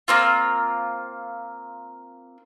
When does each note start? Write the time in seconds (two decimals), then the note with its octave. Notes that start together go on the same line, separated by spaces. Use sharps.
0.08 A#3 C4 F4